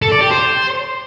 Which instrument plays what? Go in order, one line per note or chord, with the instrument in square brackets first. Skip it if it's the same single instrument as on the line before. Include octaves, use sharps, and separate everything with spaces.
[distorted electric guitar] A4
D5
G4
C5